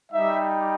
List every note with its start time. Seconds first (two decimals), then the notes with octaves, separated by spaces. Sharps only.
0.12 G3 D#4 G4 E5